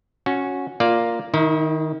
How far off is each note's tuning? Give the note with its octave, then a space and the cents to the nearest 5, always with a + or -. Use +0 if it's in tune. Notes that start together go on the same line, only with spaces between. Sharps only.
C#4 +0 F#4 -10
A#3 +0 F4 +0 D5 +0
D#3 +0 E4 -45